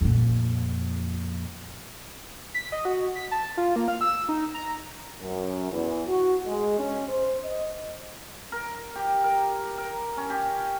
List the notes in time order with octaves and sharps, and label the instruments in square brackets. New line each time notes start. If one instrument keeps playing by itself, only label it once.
[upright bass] F2 A#2
[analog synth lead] B6
D#5
F#4
B6
A5
F4
A#3
F5
E6
D#4
A#5
[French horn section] F#2
E2
F#4
G#3
C#4
C5
D#5
[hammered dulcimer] A#4
G4
A#4
A#4
C#4
G4